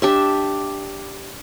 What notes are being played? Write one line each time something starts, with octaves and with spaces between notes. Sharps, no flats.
D4 G4 E5